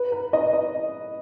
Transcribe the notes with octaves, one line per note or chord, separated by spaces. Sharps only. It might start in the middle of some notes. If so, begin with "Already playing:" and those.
Already playing: B4
B4
D#5
D#5